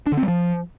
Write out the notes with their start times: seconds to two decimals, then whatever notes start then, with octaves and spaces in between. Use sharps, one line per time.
0.07 D4
0.12 D3
0.17 C4
0.23 G3
0.28 F3